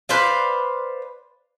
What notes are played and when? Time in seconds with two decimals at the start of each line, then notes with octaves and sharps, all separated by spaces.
0.09 B4 C5 D5 F5